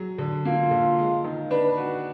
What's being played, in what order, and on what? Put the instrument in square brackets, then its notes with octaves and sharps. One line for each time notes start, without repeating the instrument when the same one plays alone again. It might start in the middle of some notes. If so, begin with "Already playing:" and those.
Already playing: [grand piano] F#3 G#4
D3
[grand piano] A#3 [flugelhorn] F4
[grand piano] D3
G#3
D#3
[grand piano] D4 [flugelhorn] B4
[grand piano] F#4